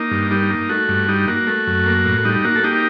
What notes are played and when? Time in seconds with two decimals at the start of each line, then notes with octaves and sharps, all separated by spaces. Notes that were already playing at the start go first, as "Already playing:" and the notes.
Already playing: A#3 D#4
0.11 G2
0.31 G3 D#4
0.50 A#3
0.69 A3 F#4
0.89 G2
1.08 G3 D#4
1.28 A#3 F#4
1.47 A3
1.67 F#2
1.86 A#3
2.05 A2
2.25 G3 D#4
2.44 A#3 F#4
2.55 A4
2.63 A#3 D#4 G4